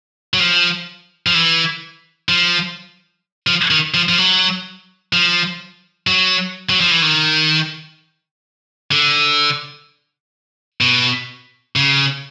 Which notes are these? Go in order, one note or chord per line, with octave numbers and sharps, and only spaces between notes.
F#3
F3
F3
E3
F3
F3
D#3
F3
F3
F#3
F3
F#3
F#3
F3
E3
D#3
D3
B2
C#3